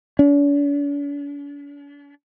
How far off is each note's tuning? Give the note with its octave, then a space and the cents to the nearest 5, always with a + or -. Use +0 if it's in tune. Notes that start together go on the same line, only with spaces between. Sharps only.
D4 -45